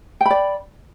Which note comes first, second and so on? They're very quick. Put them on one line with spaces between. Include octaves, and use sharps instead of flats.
G5 B5 D5